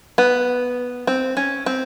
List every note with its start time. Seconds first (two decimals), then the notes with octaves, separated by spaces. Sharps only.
0.18 B3
1.07 C4
1.37 C#4
1.66 C4